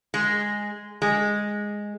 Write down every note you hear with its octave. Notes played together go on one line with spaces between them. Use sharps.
G#3
G#3